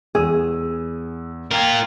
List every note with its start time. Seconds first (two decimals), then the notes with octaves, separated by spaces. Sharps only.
0.15 E2 G#4 E6 D#7
1.51 F4 A#4 G5 A#5 G#6